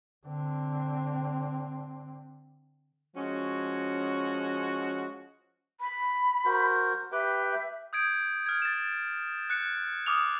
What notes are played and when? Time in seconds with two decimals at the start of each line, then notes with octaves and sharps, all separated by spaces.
0.26 D3 C4
3.16 F3 G#3 C#4 F#4
5.81 B5
6.45 F#4 A#4 C5
7.12 G4 B4 E5 G5
7.93 D#6 G6 G#6 D7
8.46 F6 G#6
8.62 A6 E7
9.50 F#6 C#7
10.06 D6 D#6 F6 F7